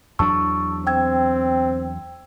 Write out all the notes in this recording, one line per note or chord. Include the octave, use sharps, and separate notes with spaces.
E2 F#3 D4 A5 C#6 E6
C4 G5 E6 G#6